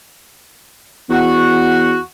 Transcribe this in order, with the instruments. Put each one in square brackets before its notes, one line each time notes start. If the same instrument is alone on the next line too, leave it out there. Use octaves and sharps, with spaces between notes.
[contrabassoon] E2 [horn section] F#4